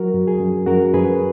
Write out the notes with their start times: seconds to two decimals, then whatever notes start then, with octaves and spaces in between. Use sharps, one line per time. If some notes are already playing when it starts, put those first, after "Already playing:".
Already playing: F#3 F#4 A#4
0.14 F#2
0.28 G#4
0.40 F#2
0.66 F#2 F#4 A#4
0.93 F#2 G#4 B4